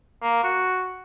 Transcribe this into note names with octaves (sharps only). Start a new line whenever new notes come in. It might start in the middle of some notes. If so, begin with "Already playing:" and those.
A#3
F#4